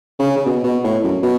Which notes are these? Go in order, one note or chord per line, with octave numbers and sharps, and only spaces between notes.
C#3
C#3
B2
B2
A2
F#2
B2